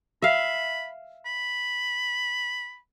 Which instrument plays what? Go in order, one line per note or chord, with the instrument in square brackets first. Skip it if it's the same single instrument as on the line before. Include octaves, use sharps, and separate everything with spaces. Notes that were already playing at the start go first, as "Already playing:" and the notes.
[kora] E5 F5 [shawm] B5
[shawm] B5